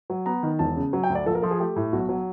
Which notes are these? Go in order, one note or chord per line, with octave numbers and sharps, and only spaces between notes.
F#3
B3 A#5
D#3
E1 A5
C#3
F#3
G5
D2
D5
A#1 A4
A#4
F3 A4
G#4
A3 G4
A2
B1 F#4
F#3